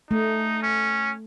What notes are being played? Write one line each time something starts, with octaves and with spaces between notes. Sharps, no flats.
A3 D#4
C#4